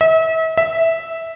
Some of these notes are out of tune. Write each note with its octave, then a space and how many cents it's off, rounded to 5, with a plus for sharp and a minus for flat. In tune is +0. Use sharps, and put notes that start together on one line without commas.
E5 -35
E5 -5